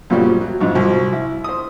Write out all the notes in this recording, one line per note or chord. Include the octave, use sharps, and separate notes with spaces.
F#2 A#2 C#3 F3 G3
F#3
G#1 F2 G#2
C2 F3 F#3
E4
C5 D#6